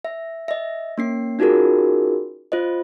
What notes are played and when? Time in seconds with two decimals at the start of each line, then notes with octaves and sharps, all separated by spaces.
0.05 E5
0.48 D#5 E5
0.98 A#3 C#4 C7
1.39 C#4 D#4 F4 F#4 G#4 A#4
2.52 F4 C5 D#5